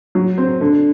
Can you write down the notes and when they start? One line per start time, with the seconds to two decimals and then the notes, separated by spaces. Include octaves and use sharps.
0.15 F#3
0.38 C4
0.61 D3